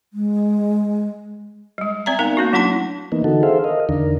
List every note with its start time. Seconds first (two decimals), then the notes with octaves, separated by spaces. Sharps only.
0.13 G#3
1.78 G3 G#3
2.06 C4 D5 E5 A#5
2.19 B3 D#4 A#4 F5
2.37 A#3 C#4 F#4
2.53 F#3 A3 D4 E4 A5 C6
3.12 E3 A#3 B3 D#4
3.24 D3 E3 D#4 F#4 A4
3.43 G#4 A4 C5 E5 F5
3.64 A#4 D#5 F5
3.89 E2 D3 D#3 D4 A#4